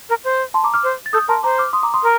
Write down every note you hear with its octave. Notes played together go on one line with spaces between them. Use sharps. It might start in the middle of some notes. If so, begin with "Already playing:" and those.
A#4
C5
A5 C6
A#5 D6
D6 F6
C5
A6
A4 D#6 G6
A#4 A5 C6
C5 A#5 D6
D6 F6
C6 D#6
A#5 D6
C6 D#6
A#4